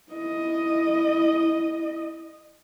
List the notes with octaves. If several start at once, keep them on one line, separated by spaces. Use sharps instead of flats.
E4 D#5